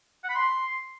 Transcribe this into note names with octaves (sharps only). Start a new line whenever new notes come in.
F#5
B5
C6